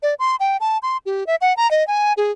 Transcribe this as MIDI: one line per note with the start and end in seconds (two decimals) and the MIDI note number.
0.03 0.14 74
0.19 0.36 84
0.40 0.57 79
0.60 0.78 81
0.83 0.97 84
1.06 1.26 67
1.27 1.36 76
1.41 1.56 78
1.57 1.69 82
1.71 1.86 75
1.87 2.13 80
2.17 2.32 68